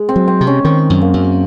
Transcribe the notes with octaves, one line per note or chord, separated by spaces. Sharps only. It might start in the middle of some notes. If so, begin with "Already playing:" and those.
Already playing: G#3
C4
F#3
C4
C3
C#4
D#3 C4
F#2
A#3
F#2